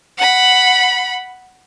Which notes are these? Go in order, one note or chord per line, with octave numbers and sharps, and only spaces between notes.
F#5 B5